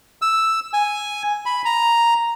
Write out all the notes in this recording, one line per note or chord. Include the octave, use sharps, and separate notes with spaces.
E6
G#5
B5
A#5